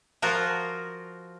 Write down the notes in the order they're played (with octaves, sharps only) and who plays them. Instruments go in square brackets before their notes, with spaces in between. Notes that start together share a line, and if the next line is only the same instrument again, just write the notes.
[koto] F3 F4 F#4 A#4